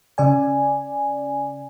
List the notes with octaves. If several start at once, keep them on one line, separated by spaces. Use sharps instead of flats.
C#3 D5 G#5